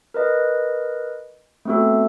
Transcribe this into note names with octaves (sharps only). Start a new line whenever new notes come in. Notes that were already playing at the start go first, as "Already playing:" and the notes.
A#4 B4 D#5
A3 B3 C4 F#4 A4